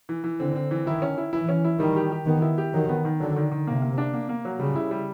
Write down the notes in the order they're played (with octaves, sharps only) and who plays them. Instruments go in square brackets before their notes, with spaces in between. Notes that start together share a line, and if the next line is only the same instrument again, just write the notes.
[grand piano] E3
E3
[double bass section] D3 [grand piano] C4
[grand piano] C4
E3
[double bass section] D#3 [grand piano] E4
[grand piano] C#4
E4
[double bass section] E3 [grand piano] E4
[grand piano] C#4
E4
[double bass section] D#3 [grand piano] G3
[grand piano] G4
G4
[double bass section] D#3 [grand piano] B3
[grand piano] E4
G4
[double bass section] D#3 [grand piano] F#3
[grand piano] B3
D#3
[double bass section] D3 [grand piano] F#3
[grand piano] D#3
D#3
[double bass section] C3 [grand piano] A#3
[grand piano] A#3
D4
A#3
A#3
F#3
[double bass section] C#3 [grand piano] G3
[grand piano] E4
G3